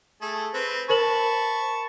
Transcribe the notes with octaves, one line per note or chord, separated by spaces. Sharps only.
A3 G#4 A4
C4 B4 C5
A#4 C5 A5 B5 C#6 F#7